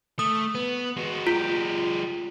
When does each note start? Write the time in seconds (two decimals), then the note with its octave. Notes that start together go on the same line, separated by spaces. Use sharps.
0.19 A3 D#6
0.55 B3
0.97 G#3 F#4
1.27 G#3 F4 G4